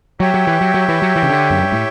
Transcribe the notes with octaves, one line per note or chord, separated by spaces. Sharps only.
F#3 G4 C#5 E5 G5
F#3
E3
F#3
F#3
E3
F#3
E3
C#3
D3
F#2
G2
A2